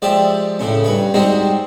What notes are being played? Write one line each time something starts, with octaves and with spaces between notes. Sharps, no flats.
F3 G#3 G4 D5 E5
A2 C#3 C#4
G2 B4 C#5
G3 G#3 C4 D#4 F#4 G4